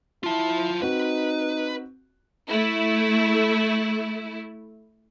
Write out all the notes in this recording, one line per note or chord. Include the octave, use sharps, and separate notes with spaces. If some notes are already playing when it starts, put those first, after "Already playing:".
E4 F4 A5
C4 D#4 F#4 B4
A3 E4